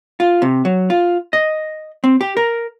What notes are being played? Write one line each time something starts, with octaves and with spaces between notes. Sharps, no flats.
F4
C3
F#3
F4
D#5
C4
G4
A#4